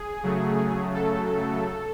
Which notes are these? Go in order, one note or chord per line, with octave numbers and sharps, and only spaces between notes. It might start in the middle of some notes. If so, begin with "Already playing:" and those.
Already playing: G#4
C#3 F#3 A3
A4